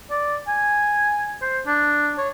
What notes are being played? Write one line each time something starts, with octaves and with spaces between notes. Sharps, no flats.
D5
G#5
C5
D4
C#5